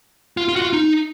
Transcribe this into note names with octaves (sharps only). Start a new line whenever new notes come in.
F4
F4
F#4
F4
D#4